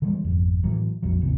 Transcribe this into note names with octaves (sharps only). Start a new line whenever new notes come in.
D3 E3 G3 G#3
G#1 F2
A2 E3 F#3
A#1 F2 F#3
G#1 D2 C3 E3